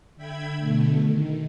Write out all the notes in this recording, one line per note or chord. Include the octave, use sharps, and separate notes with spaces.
D3 E5 G5 B5 G#6
B2 D3 A3
D#3